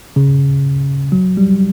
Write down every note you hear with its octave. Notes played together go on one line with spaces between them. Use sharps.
C#3
F#3
G3